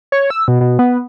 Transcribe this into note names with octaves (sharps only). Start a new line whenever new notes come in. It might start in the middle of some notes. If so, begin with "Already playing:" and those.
C#5
E6
B2
B2
B3